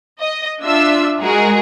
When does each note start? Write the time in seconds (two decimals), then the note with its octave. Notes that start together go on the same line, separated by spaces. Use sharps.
0.20 D#5
0.63 D4 F4 E5 E6
1.21 G#3 F#4 G#4 A#4